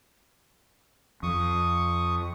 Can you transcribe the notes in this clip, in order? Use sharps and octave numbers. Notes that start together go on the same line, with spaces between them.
F2 C#6 D#6